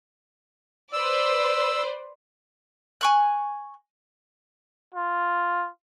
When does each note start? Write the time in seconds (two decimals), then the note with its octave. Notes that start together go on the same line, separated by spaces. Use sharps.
0.93 B4 C5 D5 E6
3.01 G#5 C#6 F#6
4.94 F4